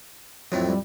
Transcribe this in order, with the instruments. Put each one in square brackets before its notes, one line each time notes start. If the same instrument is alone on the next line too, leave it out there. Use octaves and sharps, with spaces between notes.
[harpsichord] F2 A2 [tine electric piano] F#3 C4
[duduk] G3